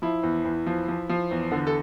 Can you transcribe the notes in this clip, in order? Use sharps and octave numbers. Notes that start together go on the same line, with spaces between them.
F3 E4
E2
E2
F3
F3
F3
E2
D3
A4